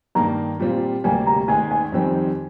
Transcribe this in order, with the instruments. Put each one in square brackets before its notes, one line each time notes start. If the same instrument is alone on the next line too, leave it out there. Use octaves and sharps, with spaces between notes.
[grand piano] G2 D#3 A#3 [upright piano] A#5
[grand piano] A#2 G3 C4 F4
[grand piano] D2 C3 G3 A#3 [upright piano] G#5
[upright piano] A#5
[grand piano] D#2 D#3 G#3 [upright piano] G#5
[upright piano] G#5
[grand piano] F2 D#3 G3 C4 D#4